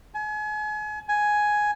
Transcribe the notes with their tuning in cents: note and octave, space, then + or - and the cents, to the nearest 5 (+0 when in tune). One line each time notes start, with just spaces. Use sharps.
G#5 +35
G#5 +5